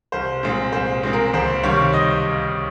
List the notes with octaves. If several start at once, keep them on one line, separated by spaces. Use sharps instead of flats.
C2 C5
A#2 G#3 C4
C2 C5
A#2 G#3 C4
A#4
C#2 C5
C3 D#3 G3 A#3 C#5
D#5